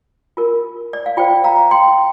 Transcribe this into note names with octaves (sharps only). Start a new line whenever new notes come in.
F4 A#4
D5
F5
F4 C5 D5 G5
F5 A#5
G5 C6